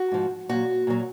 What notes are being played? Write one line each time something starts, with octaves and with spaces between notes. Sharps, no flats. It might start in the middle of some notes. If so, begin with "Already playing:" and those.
Already playing: F#4
G#2 F3
A#2 F#3 F#4
A#2 F#3